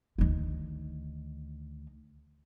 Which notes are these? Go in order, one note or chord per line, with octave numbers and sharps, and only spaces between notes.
D2 D#3